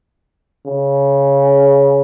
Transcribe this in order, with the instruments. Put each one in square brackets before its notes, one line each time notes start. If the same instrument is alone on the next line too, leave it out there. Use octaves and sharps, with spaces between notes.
[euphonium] C#3